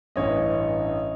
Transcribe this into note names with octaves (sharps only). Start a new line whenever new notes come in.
A1 G2 E3 C#5 D#5